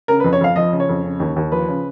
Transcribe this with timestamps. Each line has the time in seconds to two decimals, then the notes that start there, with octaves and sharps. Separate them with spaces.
0.08 C#3 A#4
0.20 B4
0.24 F2
0.33 C#5
0.41 F2 F5
0.56 F3 D#5
0.73 C#3
0.80 C#5
0.89 F2
1.04 C#3
1.20 D#2
1.36 D#2
1.52 F3 B4
1.68 C#3